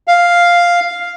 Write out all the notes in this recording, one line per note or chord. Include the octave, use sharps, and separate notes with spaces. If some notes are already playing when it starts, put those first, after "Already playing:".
F5